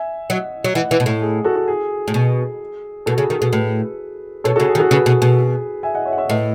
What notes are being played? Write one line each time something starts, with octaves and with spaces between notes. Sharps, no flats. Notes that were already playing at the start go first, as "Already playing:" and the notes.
Already playing: E5 G#5
F#3 D#5 F#5
F#3
E3 D#5 F#5
E3
B2
A2
G#4
F#4 A4
F#4
G#4
A2
B2
B2 F#4 A4
C#3 G#4
D#3 G#4
B2 F#4 A4
A2 G#4 B4
B2 A4 C#5
C#3 F#4 A4
G#4
D#3
F#4 A4
C#3 G#4 B4
B2
B2
E5 G#5
D#5 F#5
C#5 E5
F#5
C#5 E5
A2 B4 D#5